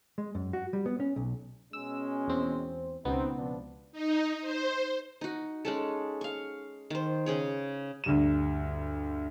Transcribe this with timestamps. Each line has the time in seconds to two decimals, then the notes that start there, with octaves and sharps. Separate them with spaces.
0.18 G#3
0.35 F#2
0.53 F#4
0.73 G3
0.86 B3
1.00 C#4
1.16 B1
1.73 B2 G#3 C#4 E6
2.28 E2 C4
3.05 C#2 B2 B3 C4 D#4
3.37 F3 D4
3.92 D#4
4.41 C5
5.21 D#4 F#4
5.65 G#3 C#4 A4
6.21 F5 C#6
6.90 D#3 C5
7.26 C#3 G#4 C#5
8.04 D2 G2 E7